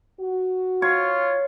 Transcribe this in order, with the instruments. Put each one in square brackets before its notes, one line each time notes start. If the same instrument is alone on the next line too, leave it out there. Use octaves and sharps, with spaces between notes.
[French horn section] F#4
[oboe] F4 [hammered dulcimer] C#5